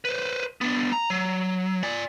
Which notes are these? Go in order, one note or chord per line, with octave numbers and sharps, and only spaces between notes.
B4 C5
B3 D4
A#5
F#3
D5 G#5